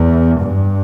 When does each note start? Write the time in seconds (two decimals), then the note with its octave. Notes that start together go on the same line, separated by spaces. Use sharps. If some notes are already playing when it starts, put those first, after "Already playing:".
Already playing: E2
0.41 G2